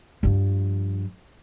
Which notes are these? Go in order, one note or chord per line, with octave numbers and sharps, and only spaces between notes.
G2 F3